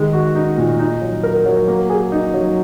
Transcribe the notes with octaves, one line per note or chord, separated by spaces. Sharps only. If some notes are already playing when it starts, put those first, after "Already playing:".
Already playing: D#3 G#3
F#4
D#4
A#2
D#4
F#3
A#4
F#3
A#3
G#4
D#4
F#3